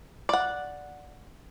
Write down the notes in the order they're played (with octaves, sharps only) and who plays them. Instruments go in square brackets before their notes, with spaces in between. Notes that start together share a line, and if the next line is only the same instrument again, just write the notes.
[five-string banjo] D5 F#5